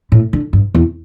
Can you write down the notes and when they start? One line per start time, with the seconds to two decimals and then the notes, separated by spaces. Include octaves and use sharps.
0.12 A2
0.33 D3
0.53 G2
0.75 E2